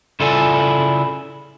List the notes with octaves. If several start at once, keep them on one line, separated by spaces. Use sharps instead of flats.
C#3 E4 F4 A4 D5 G#5